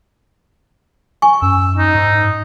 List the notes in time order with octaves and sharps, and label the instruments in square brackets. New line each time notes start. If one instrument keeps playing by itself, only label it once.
[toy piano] G#5 C#6
[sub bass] F#2 [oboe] E6
[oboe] D#4
[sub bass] G#2